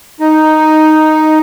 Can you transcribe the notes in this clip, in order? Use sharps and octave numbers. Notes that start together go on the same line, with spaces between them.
D#4